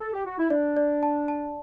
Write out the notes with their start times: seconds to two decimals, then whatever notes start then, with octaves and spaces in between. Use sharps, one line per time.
0.00 A4
0.13 G4
0.26 F#4
0.38 E4
0.50 D4 D5
0.77 D5
1.03 A5
1.28 A5